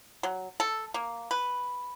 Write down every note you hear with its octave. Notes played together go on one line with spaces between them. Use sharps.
F#3
A4
A#3
B4